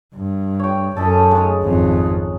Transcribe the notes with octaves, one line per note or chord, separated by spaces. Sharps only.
G2
C#5 G5
F#2 C#4 A4 D#5 B5
C#3 G#3 D#4
G#1 F2